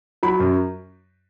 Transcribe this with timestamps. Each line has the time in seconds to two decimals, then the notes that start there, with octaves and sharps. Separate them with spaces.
0.23 F#3 B5
0.39 F#2